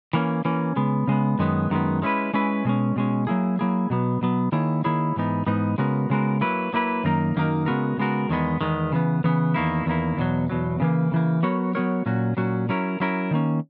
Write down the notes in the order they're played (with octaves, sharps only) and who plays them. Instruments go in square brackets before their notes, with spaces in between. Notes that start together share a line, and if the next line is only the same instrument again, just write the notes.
[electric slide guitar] E3 A#3 C#4
E3 A#3 C#4
C#3 G#3 B3
C#3 G#3 B3
F#2 D#3 G#3 B3
F#2 D#3 G#3 B3
G#3 C#4 E4 B4
G#3 C#4 E4 B4
B2 G#3 C#4
B2 G#3 C#4
F#3 A#3 E4 G#4
F#3 A#3 E4 G#4
B2 F#3 B3
B2 F#3 B3
D#3 A#3 E4 G#4 C#5
D#3 A#3 E4 G#4 C#5
G#2 E3 B3 D#4
G#2 E3 B3 D#4
C#3 G#3 B3 F#4 A#4
C#3 G#3 B3 F#4 A#4
F#3 A#3 E4 B4
F#3 A#3 E4 B4
F#2 D#3 A#3 D#4 A#4
F#2 D#3 A#3 D#4 A#4
C#3 G#3 B3 F#4 A#4
C#3 G#3 B3 F#4 A#4
E2 D#3 G#3 B3
E2 D#3 G#3 B3
C#3 E3 B3
C#3 E3 B3
E2 D#3 A#3 E4
E2 D#3 A#3 E4
E2 B2 F#3
E2 B2 F#3
C#3 E3 A#3
C#3 E3 A#3
F#3 B3 F#4 A#4 C#5
F#3 B3 F#4 A#4 C#5
A#2 F#3 C#4 F#4
A#2 F#3 C#4 F#4
F#3 C#4 E4 A#4
F#3 C#4 E4 A#4
D#3 A#3 C#4